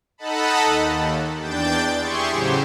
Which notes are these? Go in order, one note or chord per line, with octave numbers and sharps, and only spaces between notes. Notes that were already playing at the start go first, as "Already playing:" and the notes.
D#4 A4 D#5 F#5 A5 B5
D#2
E2 D4 G5 G6 A6
E4 G4 G#4 C6 C#6
A2 C#3 F#3 G4 C5